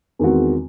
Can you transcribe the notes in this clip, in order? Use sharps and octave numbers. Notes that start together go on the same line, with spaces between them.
E2 D#3 G#3 C4 F#4